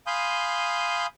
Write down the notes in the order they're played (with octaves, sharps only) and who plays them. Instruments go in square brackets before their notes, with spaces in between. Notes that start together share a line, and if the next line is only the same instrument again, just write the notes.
[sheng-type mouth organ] F5 G#5 B5 C6 D#6 G6